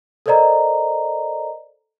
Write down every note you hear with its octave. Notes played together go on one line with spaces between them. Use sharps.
A4 A#4 C5 D5 D#5 A#5